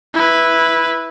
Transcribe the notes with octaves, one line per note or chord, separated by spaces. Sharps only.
E4 B4